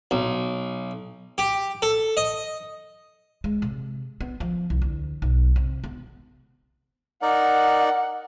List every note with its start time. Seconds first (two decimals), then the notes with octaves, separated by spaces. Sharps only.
0.11 B1
1.38 G4
1.82 A4
2.17 D#5
3.44 G#3
3.62 C3
4.21 B3
4.40 F3
4.70 C2
4.82 D2
5.22 B1
5.56 C3
5.84 B3
7.22 D#4 A#4 D5 F#5